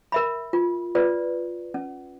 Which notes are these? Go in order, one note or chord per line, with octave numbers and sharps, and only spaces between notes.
A#4 E5 B5
F4
F4 B4 D5
C#4